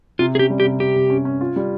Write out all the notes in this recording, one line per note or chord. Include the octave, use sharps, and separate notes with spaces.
C3 F4
C#4 G4 G#4
G3
G4
C3
C3 G4
C3
C#4
C#4
F4
G3